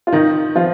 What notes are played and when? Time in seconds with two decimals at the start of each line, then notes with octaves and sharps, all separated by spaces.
0.07 F4
0.12 D#3 D#4
0.55 F3 F4